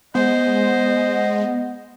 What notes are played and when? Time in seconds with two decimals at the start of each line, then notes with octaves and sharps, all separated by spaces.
0.15 G#3 B3 C5 D#5